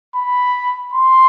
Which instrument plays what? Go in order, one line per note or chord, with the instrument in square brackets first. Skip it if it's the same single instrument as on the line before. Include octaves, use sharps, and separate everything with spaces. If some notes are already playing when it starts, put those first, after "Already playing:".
[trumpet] B5
C6